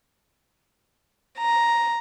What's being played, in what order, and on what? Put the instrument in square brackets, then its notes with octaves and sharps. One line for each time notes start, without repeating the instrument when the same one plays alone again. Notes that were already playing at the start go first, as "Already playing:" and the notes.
[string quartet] A#5